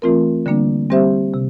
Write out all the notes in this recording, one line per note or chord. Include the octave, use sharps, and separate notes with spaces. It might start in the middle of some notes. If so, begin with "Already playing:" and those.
E3 A3 C4 F4 A#4
D3 G3 A#3 D4
G3 C4 G4 C5 E5
C3